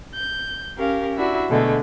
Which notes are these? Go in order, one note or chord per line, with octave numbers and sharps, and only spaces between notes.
G6
C#4 G4 A#4 F5
D4 E4 F#4 E5
B2 D3 G#3 A3